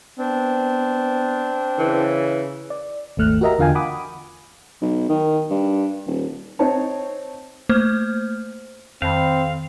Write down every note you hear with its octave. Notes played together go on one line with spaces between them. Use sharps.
B3 C4 D4
C#3 E3
D5
G#1 D#2 A3 F6 F#6
F#4 G4 A#4 D#5 E5 A#5
E2 D3 F4 F5 G5 G#5
F#5 B5 D6 D#6
B1
D#3
G2
D#1
C4 D#4 C5 C#5 A5
A3 A#3 C5 F6
F2 D#3 C4 F5 A5 B5